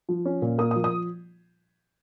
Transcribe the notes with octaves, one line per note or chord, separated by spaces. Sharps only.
F3
C#4
A#2
A#3 D#6
D#6
F3
D#6